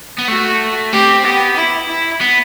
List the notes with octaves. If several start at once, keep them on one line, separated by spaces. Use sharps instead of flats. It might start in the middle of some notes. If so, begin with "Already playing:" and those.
B3
A3 F#4
C4 G4
B3 G4
E4
E4
B3